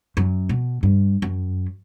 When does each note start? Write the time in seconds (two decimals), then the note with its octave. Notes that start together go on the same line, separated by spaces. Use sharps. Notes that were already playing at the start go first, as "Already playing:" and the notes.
0.17 F#2
0.49 B2
0.83 G2
1.22 F#2